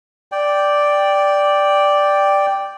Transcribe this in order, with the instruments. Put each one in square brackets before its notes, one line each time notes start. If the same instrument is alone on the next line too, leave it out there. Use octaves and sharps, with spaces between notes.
[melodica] D5 G5